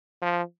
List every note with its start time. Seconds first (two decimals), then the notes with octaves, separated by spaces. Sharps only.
0.22 F3